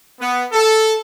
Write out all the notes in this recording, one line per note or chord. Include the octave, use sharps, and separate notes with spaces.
B3
A4